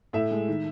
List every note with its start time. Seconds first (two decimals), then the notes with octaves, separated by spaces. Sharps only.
0.13 A2 E5
0.31 G#3
0.48 D#3